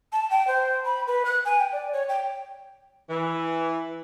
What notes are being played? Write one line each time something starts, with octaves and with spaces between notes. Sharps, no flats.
A5
G5
C5
B5
B4
F#6
G#5
G5
D5
C#5
G5
E3